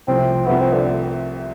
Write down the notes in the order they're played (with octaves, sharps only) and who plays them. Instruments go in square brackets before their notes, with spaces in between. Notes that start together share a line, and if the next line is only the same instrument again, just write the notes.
[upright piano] C2 C3 F3 A3 [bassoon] C4
[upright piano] C2 C3 F3 A3 [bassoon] B3
[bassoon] C4
D3